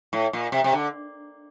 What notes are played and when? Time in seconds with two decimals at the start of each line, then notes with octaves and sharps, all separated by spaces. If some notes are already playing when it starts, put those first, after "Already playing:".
0.13 A2
0.33 A#2
0.52 C3
0.64 C3
0.73 D3